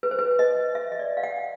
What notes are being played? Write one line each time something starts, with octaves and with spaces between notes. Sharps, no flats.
B4
C5
B4
D#5
E5
D#5
D5
F5
F#5